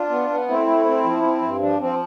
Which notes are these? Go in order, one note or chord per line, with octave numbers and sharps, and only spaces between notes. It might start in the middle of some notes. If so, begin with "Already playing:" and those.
Already playing: D4 F4
B3
B3
A3 C4 E4
A3
C4
F3
C4
G2
F3 D4
F3 C4